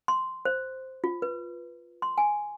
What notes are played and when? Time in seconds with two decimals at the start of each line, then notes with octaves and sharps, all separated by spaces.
0.08 C6
0.45 C5
1.04 F4
1.22 B4
2.02 C6
2.18 G#5